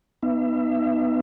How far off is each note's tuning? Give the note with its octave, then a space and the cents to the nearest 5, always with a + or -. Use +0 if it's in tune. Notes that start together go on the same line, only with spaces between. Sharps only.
B3 +0 D#4 +0 E5 +35